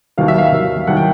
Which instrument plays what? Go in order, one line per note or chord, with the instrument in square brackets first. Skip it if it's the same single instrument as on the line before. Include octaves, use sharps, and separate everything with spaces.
[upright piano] D#2 D#3 F#3 F5
E5
F5
D#2 D#3 F#3
D#2 D#3 F#3 F#5
G5